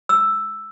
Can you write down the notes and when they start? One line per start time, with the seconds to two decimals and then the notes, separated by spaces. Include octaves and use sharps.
0.09 E6